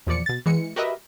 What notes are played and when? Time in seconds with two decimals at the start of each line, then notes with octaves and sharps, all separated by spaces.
0.07 E2 A#2 F3 D5 C#7
0.26 B2 A6
0.46 E3 G#3 C#7
0.76 F#4 G4 A#4 B4 D#5 E5